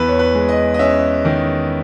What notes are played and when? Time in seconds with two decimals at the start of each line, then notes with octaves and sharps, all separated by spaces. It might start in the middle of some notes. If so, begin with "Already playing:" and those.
Already playing: E2 B4
0.08 C#5
0.19 B4
0.34 G#3
0.49 D#5
0.74 D#5
0.79 C#4 E5
1.25 D#3